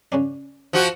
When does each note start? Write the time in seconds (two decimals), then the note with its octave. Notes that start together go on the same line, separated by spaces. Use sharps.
0.12 C#3 C#4 D4
0.73 F3 F#4